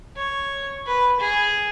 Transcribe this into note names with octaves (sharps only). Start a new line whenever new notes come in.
C#5
B4
G#4